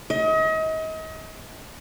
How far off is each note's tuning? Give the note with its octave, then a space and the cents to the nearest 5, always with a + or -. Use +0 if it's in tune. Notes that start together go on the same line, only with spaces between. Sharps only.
D#5 +35